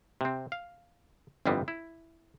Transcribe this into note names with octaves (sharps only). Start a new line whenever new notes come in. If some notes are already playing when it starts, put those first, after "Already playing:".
C3 C4
F5
G1 F2 E3 G3 B3 C4
E4